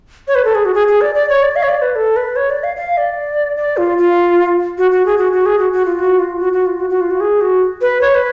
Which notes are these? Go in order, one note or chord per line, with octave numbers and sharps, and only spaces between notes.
C#5
B4
A4
G#4
F#4
G#4
G#4
D5
D5
C#5
D5
F5
C#5
D5
B4
A4
B4
C#5
D5
F5
F5
D5
D5
F4
F4
F#4
F#4
G#4
F#4
F#4
G#4
F#4
F#4
F4
F#4
F4
F#4
F#4
F4
F#4
F#4
F4
F#4
G#4
F#4
B4
C#5
B4